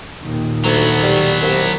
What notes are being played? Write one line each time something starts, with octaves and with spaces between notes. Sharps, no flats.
D#2 A#2 D#3
D2 F#3 B3
G3
C2